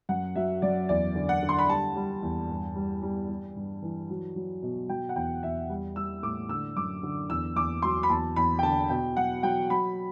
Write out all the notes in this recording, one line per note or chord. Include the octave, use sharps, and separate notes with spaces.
F#2 F#5
F#3 E5
F#2 D5
E2 D5
D3
F#5
D3
C6
B5
G3 A5
G3
E2
G2
G3
G3
G3
G2
E3
F#3
F#3
B2
F#3 G5
F#5
E2 G5
E2 E5
G3
G3 E6
A2 D6
D3 E6
F#2 D6
D3
E2 E6
E2 D6
F#3 C6
B5
E2 A5
E2 B5
G5
D3 A5
B2 G5
F#3 F#5
F#3 G5
F#3 B5